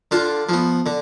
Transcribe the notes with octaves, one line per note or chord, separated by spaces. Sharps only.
D3 D4 F4
F3 B3
D3